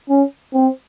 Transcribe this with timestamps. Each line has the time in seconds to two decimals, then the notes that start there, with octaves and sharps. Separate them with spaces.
0.09 C#4
0.54 C4